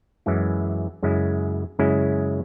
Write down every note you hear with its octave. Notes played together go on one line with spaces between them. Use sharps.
F#2 E3 G#3 C#4 E4
F#2 C#3 G#3 C#4 E4
F#2 C#3 G#3 C#4 E4